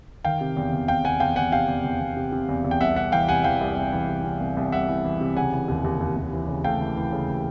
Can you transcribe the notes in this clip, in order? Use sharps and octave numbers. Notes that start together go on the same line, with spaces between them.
D#3 F5 G5
C3
E2
E2
C3 F5 G5
E2 F#5 G#5
E2 F5 G5
E2 F#5 G#5
C3 F5 G5
E2
E2
E2
C3
C3
E2
E2
G5
C2 E5 F#5
C3 E5 F#5
E3 F5 G5
C3 F#5 G#5
E3 F5 G5
C2
C2
E3
C3
C3
C2
C2
C2 E5 F#5
E3
E3
C3
C#3 F#5 G#5
E3
D#2
D#2
D#2
D#2
E3
C#3
A3 F5 G5
E3
E3
C#3
E3